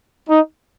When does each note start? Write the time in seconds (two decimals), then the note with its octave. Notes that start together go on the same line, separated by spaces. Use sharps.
0.30 D#4